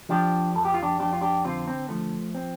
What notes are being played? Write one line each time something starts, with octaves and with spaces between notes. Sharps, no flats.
F3 D4 G4
F2 A4
G4
F4
D4 G4
F2 D4 G4
F4
D4 G4
D3 C4 F4
C4
F3 A3
C4